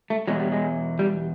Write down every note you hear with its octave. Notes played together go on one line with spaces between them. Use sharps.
A3
E2 B2 F#3 G#3
G3
G#3
G3